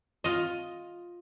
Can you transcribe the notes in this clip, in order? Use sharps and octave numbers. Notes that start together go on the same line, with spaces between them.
F4 D#5